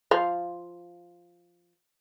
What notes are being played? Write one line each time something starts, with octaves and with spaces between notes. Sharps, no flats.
F3 F5